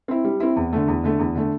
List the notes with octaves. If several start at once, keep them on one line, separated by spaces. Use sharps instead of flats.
C4 E4
G3
C4 E4
E2
D3 A3
E2
D3 A3
E2
D3 A3